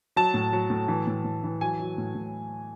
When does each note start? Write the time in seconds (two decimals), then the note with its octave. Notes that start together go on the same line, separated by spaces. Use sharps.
0.16 F#3 A5
0.34 A2
0.53 F#3
0.70 A2
0.88 E3
1.07 A2
1.24 A2
1.44 E3
1.61 F#3 G#5
1.80 F#3
1.98 A2
2.15 A2